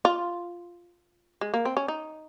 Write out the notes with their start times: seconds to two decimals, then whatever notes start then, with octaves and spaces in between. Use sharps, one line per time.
0.05 F4
1.41 G#3
1.54 A#3
1.65 C4
1.77 C#4
1.88 D#4